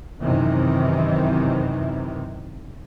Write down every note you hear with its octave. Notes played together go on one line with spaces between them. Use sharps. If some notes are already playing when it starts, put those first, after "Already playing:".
F#2 C3 D#3 E3